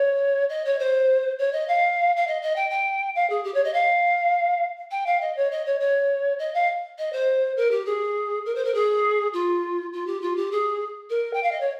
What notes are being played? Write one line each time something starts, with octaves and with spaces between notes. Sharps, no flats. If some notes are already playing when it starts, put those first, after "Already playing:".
Already playing: C#5
D#5
C#5
C5
C#5
D#5
F5
F5
D#5
D#5
G5
G5
F5
G#4
G4
C#5
D#5
F5
G5
F5
D#5
C#5
D#5
C#5
C#5
D#5
F5
D#5
C5
A#4
G4
G#4
A#4
C5
A#4
G#4
F4
F4
G4
F4
G4
G#4
A#4
G5
F5
D#5
C#5